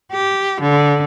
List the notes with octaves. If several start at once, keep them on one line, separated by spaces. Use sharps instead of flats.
G4
D3